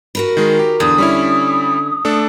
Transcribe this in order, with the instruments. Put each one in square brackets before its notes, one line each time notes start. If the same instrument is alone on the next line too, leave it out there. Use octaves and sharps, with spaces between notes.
[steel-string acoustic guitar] F#4 A#4 B4
[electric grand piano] D#3 G#3
G4
[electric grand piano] E2 [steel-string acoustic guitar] D3 [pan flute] D#6
[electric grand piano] G3 C#4 E4
A3 D4 A4